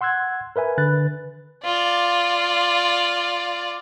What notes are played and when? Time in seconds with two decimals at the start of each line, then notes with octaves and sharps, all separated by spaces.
0.01 F#5 C6 E6 F#6 G#6
0.56 A#4 B4 E5 G#5
0.78 D3 B4 F#6 A6
1.64 F4 D5